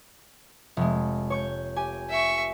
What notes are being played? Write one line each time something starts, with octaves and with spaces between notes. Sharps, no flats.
F1 G#3
C#5 C#6 G6
G4 G#5
E5 C#6